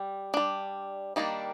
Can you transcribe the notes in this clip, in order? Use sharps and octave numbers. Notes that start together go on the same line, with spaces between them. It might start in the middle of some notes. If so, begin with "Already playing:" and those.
Already playing: G3
G3 D4
D#3 G3 A#3 D4